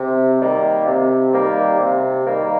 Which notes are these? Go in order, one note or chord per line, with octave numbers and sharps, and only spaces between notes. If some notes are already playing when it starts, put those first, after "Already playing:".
Already playing: C3
D#3 G3 A#3
C3
D#3 G3 A#3
C3
D#3 G3 A#3